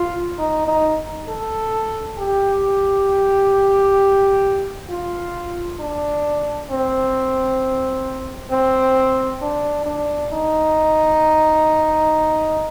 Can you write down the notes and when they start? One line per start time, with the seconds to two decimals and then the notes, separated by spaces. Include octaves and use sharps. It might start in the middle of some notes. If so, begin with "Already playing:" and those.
Already playing: F4
0.38 D#4
0.68 D#4
1.29 A4
2.18 G4
4.90 F4
5.80 D4
6.70 C4
8.51 C4
9.42 D4
9.86 D4
10.32 D#4